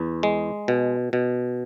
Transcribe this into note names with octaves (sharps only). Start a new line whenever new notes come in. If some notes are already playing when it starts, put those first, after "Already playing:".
Already playing: E2
G#3
B2
B2